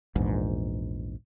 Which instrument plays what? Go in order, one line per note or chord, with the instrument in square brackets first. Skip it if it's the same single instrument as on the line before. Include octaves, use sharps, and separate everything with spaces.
[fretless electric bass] A#1 E2 G#2